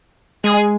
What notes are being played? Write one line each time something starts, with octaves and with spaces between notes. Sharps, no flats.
G#3 G#4